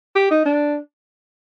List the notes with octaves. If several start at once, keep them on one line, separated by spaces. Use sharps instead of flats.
G4
D#4
D4